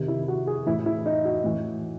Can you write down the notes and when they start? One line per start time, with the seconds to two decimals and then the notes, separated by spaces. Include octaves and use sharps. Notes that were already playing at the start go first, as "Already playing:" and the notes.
Already playing: C3 D#3
0.08 E4
0.28 F#4
0.47 G#4
0.66 A2 E3 E4
0.86 E4
1.06 D#4
1.25 F#4
1.44 A2 E3